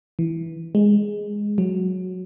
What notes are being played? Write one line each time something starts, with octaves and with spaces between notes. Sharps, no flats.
E3
G#3
F#3